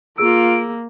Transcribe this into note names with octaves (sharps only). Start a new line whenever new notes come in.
A#3 F4 G#4 E6 D7